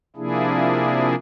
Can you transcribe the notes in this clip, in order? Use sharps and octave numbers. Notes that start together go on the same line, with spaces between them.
C3 F3 A#3 D4 E4 G#4